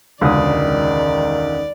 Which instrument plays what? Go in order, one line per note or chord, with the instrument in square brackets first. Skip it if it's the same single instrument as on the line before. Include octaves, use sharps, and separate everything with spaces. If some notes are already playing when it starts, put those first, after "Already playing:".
[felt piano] E1 C#2 D3 [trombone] D#3 [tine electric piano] C#4 D#4 D#6 [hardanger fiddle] D5